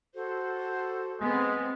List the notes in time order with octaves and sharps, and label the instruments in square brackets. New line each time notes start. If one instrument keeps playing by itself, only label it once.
[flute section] F#4 A4 C5
[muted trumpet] G#3 [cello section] B3 C4